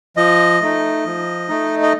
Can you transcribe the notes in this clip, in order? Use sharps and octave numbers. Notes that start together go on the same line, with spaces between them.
F3 D#5
A3 D#4
F3
A3 D#4
D#5